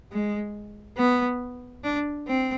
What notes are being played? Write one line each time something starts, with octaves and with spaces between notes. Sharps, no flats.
G#3
B3
D4
C4